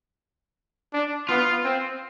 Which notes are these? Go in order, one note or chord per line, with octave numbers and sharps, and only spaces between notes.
D4
B3 F4
C4